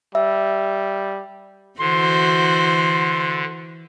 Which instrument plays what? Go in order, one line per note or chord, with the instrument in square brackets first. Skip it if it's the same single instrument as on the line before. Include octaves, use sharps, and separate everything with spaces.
[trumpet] G3 [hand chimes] E5
[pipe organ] D3 [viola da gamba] E3 F#4 C5 [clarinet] C6